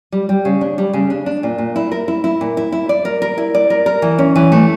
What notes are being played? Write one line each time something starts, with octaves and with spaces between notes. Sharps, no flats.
G3
G3
C#3
D4
G3
C#3
D4
D4
A#2
A#2
E4
A#4
E4
E4
A#2
E4
E4
D5
A#4
A#4
E4
D5
A#4
A#4
E3
C#4
E3
A3